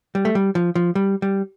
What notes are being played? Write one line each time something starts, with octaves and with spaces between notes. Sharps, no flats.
G3
A3
G3
F3
F3
G3
G3